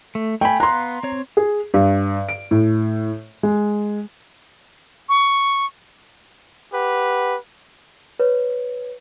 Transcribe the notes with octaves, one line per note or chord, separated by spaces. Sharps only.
A3
A3 G5 G#5 B5
B3 F5 A#5 C6 F#6
C4 C#5
G#4
G2
D7
A2
G#3
C#6
G4 B4 F#5
B4 C#5